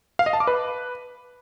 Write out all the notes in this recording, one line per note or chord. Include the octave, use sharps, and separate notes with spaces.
F5
D#5
A5
D6
B4